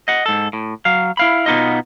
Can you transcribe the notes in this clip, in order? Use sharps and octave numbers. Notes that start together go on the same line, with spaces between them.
D#5 F#5
G#2 A4
A2
F#3 F5
E4 F5 B5
B2 B3 D#4 F4 D#5